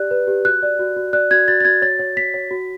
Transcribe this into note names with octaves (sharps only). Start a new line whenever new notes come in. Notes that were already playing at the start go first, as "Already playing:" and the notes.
Already playing: G4 D5 F#6
B4
G4
F#4 F#6
D5
F#4
F#4
D5 F#6
F#4 G#6
F#4 A6
A6
F#4 G#6
C#5 A6
C#5
C#5 B6
C#5
F#4